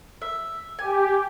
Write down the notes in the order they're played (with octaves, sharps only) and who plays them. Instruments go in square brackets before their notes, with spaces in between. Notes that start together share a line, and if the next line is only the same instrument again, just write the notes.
[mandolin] E5
[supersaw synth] G4 [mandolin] G#5